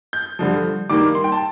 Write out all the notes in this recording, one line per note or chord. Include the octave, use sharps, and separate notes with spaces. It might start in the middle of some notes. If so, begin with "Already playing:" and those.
G6
G2 D3 F3
G2 D#3 A#3 D6
C6
G5
A5